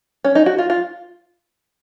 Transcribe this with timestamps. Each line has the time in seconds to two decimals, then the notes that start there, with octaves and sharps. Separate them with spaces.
0.24 C#4
0.35 D#4
0.46 F#4
0.58 F4
0.70 F4